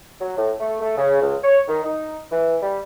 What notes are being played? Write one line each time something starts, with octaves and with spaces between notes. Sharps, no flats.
F#3
A2
A3
A3
C#3
C#2
C#5
D#3
D#4
E3
G3